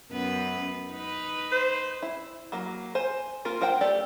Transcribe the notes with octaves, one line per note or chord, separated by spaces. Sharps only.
F#2 B3 B4
D#4 B4
C5
E4
F#3 A#3
C5 G#5
A#3 F4 A#4
D4 A#4 C5 F#5 G5
A3 G4 A4 D5